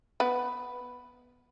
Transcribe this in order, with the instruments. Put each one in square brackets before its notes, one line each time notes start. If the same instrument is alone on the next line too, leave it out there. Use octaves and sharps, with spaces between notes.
[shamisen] B3 B4